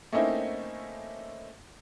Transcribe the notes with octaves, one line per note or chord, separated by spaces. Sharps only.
A3 A#3 C4 C#4 D#4 E4